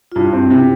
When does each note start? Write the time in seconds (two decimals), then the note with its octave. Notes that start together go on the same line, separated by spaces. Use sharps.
0.12 F4
0.16 G2 E4 F#4
0.33 C4
0.50 C3 E4 F#4